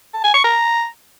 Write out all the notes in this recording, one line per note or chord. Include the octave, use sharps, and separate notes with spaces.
A5
G#5
C#6
A#5